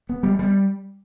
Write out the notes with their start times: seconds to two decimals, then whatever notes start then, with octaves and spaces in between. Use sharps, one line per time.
0.09 B3
0.23 G3
0.39 G3